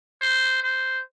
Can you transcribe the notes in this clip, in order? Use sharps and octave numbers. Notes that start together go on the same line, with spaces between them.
C5
C5